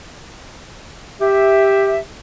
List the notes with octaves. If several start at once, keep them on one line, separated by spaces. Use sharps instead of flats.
G4 E5